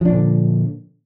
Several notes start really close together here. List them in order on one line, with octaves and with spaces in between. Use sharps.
F3 D4 A#2 D3